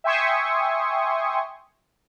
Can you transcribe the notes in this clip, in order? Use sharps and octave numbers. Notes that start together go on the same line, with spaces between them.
E5 G5 G#5 C6 C#6 D#6